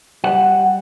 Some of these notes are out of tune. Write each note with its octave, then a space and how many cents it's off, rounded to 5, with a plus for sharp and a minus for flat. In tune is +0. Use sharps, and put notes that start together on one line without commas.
G3 +0 F#5 +0